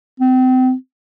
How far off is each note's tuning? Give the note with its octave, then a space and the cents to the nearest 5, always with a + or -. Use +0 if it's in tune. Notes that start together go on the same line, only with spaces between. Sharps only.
C4 -35